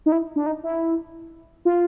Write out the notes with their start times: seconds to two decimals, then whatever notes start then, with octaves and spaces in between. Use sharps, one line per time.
0.06 D#4
0.12 E4
0.36 D4
0.46 D#4
0.64 E4
1.65 F4